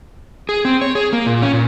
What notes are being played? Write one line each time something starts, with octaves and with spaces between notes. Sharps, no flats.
G#4
C4
C#5
G#4
A#3
A#2
C#4
A#2